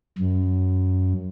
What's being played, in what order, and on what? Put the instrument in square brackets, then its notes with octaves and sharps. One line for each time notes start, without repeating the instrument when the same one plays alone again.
[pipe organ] F#2